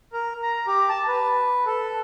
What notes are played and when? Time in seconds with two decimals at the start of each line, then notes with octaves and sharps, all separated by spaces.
0.13 A#4
0.42 A#5
0.67 G4
0.89 A5
1.08 B4
1.66 A4